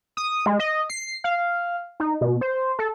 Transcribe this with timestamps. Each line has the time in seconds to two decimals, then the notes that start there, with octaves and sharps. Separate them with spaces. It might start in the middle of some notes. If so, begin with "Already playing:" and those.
0.17 D#6
0.46 G#3
0.60 D#5
0.90 C7
1.24 F5
2.00 D#4
2.21 B2
2.41 C5
2.79 A4